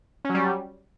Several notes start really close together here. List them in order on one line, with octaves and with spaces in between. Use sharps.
C#4 F#3 G3